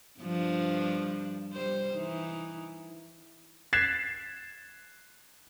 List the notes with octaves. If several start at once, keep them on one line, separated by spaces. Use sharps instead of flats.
G2 F3 D4
G3 C5
E3 D#4
F#6 G#6 A6 B6 C7 E7